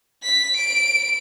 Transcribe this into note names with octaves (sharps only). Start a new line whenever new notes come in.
B6
D7